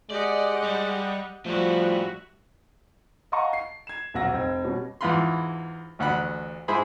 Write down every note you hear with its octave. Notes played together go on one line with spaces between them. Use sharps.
G#3 G4 D5 D#5 F#5
G3
A2 F3 G3 F#4 E5
D#5 F5 F#5 A5 A#5 C#6
C7
G#6 E7
D#1 B1 F#5 E6 A#6
F1 C4 G5 E6 G#6
B2 G3 C#4
E2 G#2 E3 F4 B5 C6
A1 D2 F#5 B5
G#2 E4 G#4 C5 B5